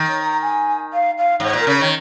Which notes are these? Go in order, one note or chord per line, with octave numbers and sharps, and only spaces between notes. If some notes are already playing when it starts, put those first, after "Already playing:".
Already playing: D#3
C#5
A#5
G#5
F5
F5
G#2 C#5
A#2
A#4
C#3
D#3 C#5